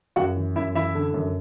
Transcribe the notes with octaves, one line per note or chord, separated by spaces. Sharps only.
F#2 F#4 F#5
E3
F#2 E4 E5
E3 E4 E5
D3
F#2